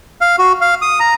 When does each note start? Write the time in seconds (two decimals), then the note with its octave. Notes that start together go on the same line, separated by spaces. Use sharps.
0.21 F5
0.39 F#4
0.61 F5
0.82 D#6
1.00 A#5